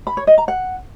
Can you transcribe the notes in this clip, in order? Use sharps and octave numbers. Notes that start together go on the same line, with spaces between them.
B5
C#5
D#5
A#5
F#5